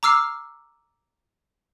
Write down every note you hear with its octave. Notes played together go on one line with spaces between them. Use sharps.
A#5 D6 E6 F6 C7